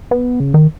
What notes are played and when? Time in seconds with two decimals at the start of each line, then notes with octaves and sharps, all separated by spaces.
0.11 B3
0.40 C#3
0.54 D#3